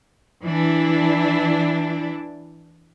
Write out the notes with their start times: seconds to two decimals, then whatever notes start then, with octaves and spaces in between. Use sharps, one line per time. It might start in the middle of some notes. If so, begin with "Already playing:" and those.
0.44 E3 D4 E4